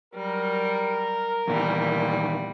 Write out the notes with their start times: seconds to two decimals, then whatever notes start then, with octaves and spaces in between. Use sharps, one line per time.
0.15 F#3 G3 A#4
1.48 E2 A#2 D#3 E3 G3